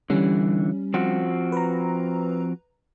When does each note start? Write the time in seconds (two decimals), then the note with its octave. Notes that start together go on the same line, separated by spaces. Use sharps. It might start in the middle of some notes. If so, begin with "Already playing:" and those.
0.10 D3 E3 G3 C#4
0.94 F3 C4 F#4
1.52 B4 A#5